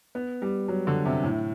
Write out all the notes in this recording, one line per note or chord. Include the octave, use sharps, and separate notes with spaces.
B3
G3
F#3
D3
C3
A2